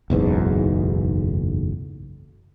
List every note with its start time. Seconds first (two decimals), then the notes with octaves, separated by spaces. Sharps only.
0.10 F#1 B1 E2 G#2